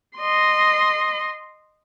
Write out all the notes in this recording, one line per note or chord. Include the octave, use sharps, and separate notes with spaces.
D#5 C6